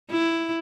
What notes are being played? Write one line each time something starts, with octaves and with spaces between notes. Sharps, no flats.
E4